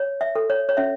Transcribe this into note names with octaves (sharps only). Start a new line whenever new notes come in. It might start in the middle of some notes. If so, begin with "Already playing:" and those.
Already playing: C#5
E5
A4
C#5
C#5
C#4 E5